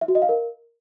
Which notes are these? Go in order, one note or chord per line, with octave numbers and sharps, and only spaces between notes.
E5
F#4
D#5
F5
A#4